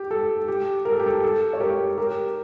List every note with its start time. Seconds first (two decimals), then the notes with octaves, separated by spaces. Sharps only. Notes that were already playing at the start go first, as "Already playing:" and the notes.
Already playing: G4
0.11 A4
0.48 G4
0.85 A#4
0.92 A4
1.00 G4
1.06 A4
1.23 A4
1.53 C#5
1.60 G4 A#4
1.98 G4 A#4